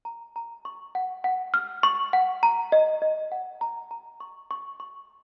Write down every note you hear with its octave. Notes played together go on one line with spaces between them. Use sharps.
A#5
A#5
C#6
F#5
F#5
F6
C#6
F#5
A#5
D#5
D#5
F#5
A#5
A#5
C#6
C#6
C#6